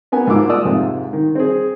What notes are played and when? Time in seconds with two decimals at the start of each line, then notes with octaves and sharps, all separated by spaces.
0.12 A#3 B3 G#5
0.27 G#2 F3 A#3 F#4 D6 E6
0.48 A#3 F4 D5 D#6 E6
0.65 F2 G#2 C3
1.13 D#3
1.35 C4 G#4